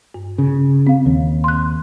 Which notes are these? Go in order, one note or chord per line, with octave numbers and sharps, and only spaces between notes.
G2
C#3
C4 F5
D#2
C6 F#6